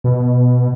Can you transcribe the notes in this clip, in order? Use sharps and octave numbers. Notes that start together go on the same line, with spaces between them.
B2